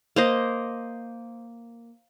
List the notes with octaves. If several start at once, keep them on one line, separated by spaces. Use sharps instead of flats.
A#3 C5 D#5